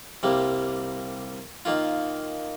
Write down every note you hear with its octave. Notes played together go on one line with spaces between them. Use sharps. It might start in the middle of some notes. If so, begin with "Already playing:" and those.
C2 C3 G3 A#3
D#3 A#3 F4